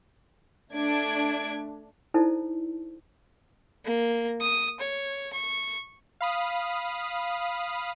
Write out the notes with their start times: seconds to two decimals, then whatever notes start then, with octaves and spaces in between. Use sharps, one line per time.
0.74 A3 D4 G#6 D7
2.14 D#4 E4 A4 C5 D5 A5
3.84 A#3
4.41 D#6
4.80 C#5
5.33 C#6
6.21 F5 B5 D#6